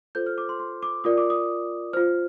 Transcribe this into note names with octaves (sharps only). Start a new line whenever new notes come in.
F4 A4 C5 G6
F6
D6
C6
C6
D6
F4 A#4 D5 D#6
D6
D#6
F4 C5 F6